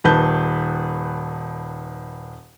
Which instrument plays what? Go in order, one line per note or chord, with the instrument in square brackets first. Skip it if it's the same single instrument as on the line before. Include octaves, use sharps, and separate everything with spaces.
[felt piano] D#1 D#3 B4 A5 G6